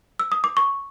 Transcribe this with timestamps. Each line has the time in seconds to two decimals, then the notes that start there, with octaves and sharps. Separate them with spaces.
0.19 E6
0.32 D#6
0.44 D6
0.57 C#6